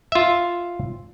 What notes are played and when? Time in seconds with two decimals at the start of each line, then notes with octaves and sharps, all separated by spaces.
0.12 F4 E5